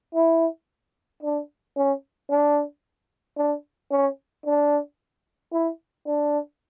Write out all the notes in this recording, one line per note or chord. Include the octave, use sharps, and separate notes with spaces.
E4
D4
C#4
D4
D4
C#4
D4
E4
D4